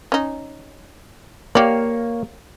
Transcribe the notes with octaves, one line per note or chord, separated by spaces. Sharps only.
C#4 D#4
A#3 G4 C#5 D5 F5